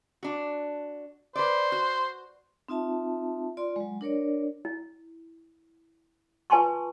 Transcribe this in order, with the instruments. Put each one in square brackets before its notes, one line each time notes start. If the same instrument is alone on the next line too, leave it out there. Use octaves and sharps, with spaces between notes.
[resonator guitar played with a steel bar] D4 F#4
[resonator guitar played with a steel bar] B4 D5 [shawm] C5
[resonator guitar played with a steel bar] F#4
[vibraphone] C4 D#4 F4 E5 A5
F4 D5 C6
F#3 G#3
D4 A#4 C#5 D5
[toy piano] E4
F4 B4 G#5 A5 C6 C#6